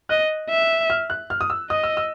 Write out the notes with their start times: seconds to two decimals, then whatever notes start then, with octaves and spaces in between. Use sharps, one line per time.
0.09 D#5 F#6
0.50 E5
0.90 F6
1.10 F#6
1.30 F6
1.41 D#6
1.50 E6
1.70 D#5 D#6
1.83 E6
1.97 E6